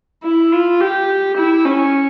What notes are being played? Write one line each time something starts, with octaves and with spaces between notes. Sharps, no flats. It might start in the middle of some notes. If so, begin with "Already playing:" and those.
E4
F4
G4
E4
C#4